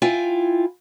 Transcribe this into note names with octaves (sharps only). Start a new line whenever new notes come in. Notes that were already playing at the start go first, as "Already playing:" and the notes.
E4 F4 G5 G#5